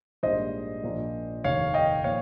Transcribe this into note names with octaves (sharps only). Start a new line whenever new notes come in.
A#1 G#2 G3 A#3 C5 D#5
A#1 A#2 F3 A#3
F1 D#2 D#3 C#5 F5
D#5 G5
A#2 F3 C#5 F5